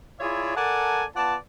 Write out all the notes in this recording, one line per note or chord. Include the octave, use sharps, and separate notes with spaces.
E4 F4 G#4 C#5 D5 E5
A4 A#4 D5 F#5 G#5 A5
B3 F4 D5 F#5 A5